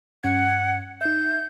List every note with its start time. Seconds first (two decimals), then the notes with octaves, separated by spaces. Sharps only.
0.24 G2 C#4 F#5 G#6
1.01 D#4 E5 G6